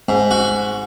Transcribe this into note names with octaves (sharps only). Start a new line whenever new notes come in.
G#2
F#4